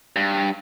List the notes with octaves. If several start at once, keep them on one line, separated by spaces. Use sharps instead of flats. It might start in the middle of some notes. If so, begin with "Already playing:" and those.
G2